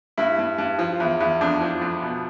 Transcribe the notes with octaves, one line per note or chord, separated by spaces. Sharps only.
G2 E4
G2
G2
F3
E2
E2
F2 D4
F3
F2
B2